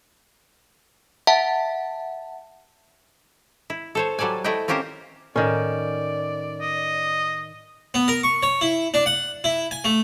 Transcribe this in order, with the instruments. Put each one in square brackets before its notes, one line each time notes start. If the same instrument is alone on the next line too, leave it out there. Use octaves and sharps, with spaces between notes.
[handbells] E5 F#5 A5
[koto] E4
A4 C5 C#5
F#3 G3 A4 D5 G#5
A3 E4 D#5 G5
C4 C#4 F4 G4 A#4 C5
[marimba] A2 [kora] D#3 C#4 [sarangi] D5
[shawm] D#5
[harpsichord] B3
A#4
C#6
C#5
E4
D4
F#5
E4
G#5
A3